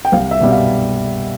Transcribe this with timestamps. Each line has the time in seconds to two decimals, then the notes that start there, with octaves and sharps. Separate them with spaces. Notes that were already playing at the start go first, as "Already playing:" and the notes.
0.05 G5
0.12 C2 F5
0.31 E5
0.41 B2 G3
0.51 F5